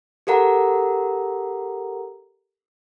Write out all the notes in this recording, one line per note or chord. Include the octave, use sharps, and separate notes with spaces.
G4 A4 A#4 F#5 A#5